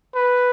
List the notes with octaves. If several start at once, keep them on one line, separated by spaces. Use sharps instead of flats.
B4